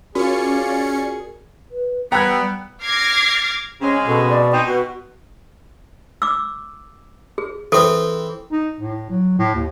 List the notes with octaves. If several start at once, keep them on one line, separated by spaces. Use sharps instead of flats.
C#4 F4 F#4 G#4 A#4 D5 C#7
B4
G3 B3 G5 A#5 B5 E6 F#6 G#6
D6 F6 G#6 A#6 C7
C#3 G#3 C4 C#4
B2 A4
D5
C4 D#4 G5
B2 F#4
D6 E6
G#4
E3 C4 A4
D#4
A2
F#3
A2
D#2